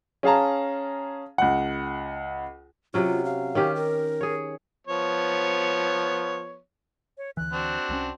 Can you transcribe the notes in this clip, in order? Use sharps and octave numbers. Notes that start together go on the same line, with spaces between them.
C#4 G#4 F5 A5 A#5
C#2 F#5
C3 F#3 C#4 F4
F5
D#3 C#4 G4
A#4
G#4 C#5
F3 B3 C#5
C#5
D2 E3 F#6
C4 D4 F#4
C2 F#3 C#4